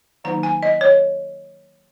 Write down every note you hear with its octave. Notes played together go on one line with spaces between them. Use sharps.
D#3 F#3 A#3 D#4 A#5
G#5
D#5
C#5